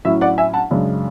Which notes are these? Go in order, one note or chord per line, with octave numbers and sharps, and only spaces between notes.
A2 F#3 C#4 E4 E5
D5 F#5
E5 G#5
F#5 A5
F#2 C#3 G#3 D4